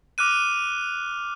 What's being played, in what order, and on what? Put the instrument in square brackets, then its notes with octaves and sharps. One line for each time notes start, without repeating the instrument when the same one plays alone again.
[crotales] D6 F6 F#6 D#7